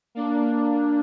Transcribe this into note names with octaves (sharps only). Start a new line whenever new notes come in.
A#3 D4